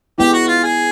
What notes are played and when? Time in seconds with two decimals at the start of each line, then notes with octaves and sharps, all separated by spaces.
0.18 G#3 B3 E4 G4
0.33 F#4
0.48 F4
0.63 G#4